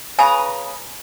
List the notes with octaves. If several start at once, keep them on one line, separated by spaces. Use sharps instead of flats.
C#3 B4 G#5 A#5 D#6